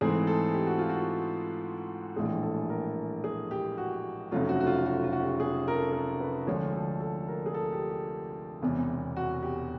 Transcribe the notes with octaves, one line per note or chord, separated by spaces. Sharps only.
G#2 E3 A3 C4 G#4
A4
G4
F#4
F4
F#4
A#1 A2 E3 G#3 G#4
A4
A#4
G#4
G4
F#4
F1 F2 C#3 F#3 A3 F4
F#4
F#4
F4
F#4
F4
F#4
G4
G#4
A#4
A4
A#4
B4
D2 D3 F3 G#3 C#5
A4
A4
A#4
G#4
A4
G4
G4
E1 E2 C3
F#4
G4